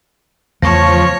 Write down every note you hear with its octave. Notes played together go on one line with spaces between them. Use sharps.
E2 C#3 F3 A3 C#5 A5 C#6 A#6